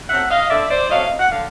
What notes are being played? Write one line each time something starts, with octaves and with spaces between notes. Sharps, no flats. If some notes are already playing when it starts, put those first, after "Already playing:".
F#3 A3 C4 E5 F#5
D#5 F5
D3 D5 E5
C5 D5
F#3 A3 C4 D#5 F5
F#5
D3 F5